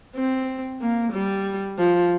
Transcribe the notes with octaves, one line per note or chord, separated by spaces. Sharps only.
C4
A#3
G3
F3